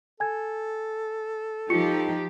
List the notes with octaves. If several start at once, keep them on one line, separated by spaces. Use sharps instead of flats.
A4 G#5 G#6
F3 D#4 F4 G4 C#6 C#7